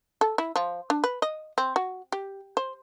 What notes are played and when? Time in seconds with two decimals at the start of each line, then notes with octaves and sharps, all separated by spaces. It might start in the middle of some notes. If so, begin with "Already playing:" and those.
0.21 A4
0.38 E4
0.56 F3
0.90 D4
1.04 B4
1.22 D#5
1.58 C4
1.76 F#4
2.12 G4
2.57 C5